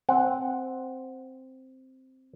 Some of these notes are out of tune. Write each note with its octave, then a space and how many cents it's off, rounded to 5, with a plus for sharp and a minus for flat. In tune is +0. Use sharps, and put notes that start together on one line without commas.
C4 +0 F#5 +0